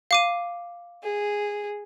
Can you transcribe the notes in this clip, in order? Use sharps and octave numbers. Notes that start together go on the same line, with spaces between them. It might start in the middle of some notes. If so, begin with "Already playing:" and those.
F5 D6 D#7
G#4